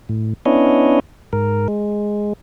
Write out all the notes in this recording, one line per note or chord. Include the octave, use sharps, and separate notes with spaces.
A2
B3 C#4 D4 E4 C#5 D#5
G#2 A#4
G#3